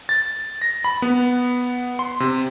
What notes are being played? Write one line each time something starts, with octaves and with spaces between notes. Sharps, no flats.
A6
A#6
B5
B3
C6
C3